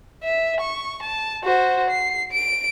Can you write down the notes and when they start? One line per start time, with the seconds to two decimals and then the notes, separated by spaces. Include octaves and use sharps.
0.24 E5
0.60 C#6
1.03 A5
1.44 F#4 C5
1.90 C7
2.32 D7